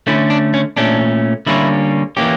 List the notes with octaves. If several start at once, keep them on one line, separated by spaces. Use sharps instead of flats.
D3 A3 C#4 E4
D4
C#4
A#2 A3 C#4 D4
D3 G3 A#3 C#4 E4
E3 A#3 C#4 G4